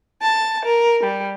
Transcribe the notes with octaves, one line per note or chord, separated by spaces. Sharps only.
A5
A#4
G3